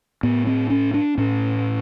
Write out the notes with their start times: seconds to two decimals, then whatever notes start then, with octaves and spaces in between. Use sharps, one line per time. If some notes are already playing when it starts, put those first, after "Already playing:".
0.23 A2 B3
0.47 C4
0.70 C#4
0.94 D4
1.18 A2 C#4